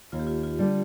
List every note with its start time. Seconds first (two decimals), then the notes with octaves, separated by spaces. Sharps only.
0.12 D#2 F4
0.20 G4
0.27 F4
0.43 F4
0.59 D3 G3